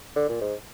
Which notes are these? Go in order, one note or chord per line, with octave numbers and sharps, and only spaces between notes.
D3
A#2
G#2